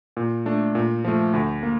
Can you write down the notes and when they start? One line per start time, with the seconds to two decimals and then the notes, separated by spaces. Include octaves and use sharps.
0.17 A#2
0.46 A3 D4
0.75 A#2
1.04 F3 A3
1.33 D2
1.63 A#3